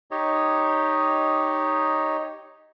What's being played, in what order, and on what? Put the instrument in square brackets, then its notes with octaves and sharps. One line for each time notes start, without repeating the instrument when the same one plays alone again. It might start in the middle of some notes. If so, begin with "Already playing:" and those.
[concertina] D#4 G4 C#5 D#5